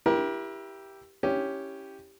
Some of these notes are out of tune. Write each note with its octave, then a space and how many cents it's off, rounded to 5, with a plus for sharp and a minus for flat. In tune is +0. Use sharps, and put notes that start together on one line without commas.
E4 +10 G4 +0 A#4 +35
C#4 +0 E4 -5 G4 +0